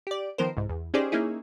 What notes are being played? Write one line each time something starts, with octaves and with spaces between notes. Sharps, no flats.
G4 D5
D#3 F3 B3 A#4 C5
C2 G#2
E2
C#4 D#4 G4 G#4 C5 D5
A#3 C#4 D#4 E4 G#4